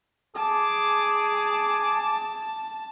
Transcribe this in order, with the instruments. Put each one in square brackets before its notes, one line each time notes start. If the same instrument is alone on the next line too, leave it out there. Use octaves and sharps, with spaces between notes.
[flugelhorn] G#4 [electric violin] A5 [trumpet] D6